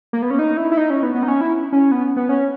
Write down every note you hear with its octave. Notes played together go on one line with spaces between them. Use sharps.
A#3
B3
C#4
D#4
E4
E4
D#4
C#4
B3
B3
D#4
C#4
E4
C#4
B3
B3
C#4